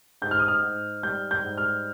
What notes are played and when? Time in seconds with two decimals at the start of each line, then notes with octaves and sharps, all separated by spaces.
0.22 G#2 G6
0.31 F6
0.39 D#6
0.48 F6
0.63 G#2
1.03 G3 G6
1.31 G6
1.44 G#2
1.58 F6